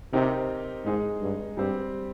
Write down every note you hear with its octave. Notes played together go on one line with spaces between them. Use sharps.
C3 C4 D#4 G4 A#4
G#2 G#3 D#4 G#4
G2
G2 G3 C4 G4